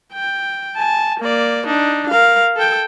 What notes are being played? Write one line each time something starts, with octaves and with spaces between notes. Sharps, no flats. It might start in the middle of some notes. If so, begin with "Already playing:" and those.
G5
G#5 A5
A#3 D5
D4 D#4
A#4 F5
A4 G5